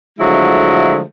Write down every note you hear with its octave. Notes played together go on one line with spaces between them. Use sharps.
D3 F3 F#3 G#3 A3 E4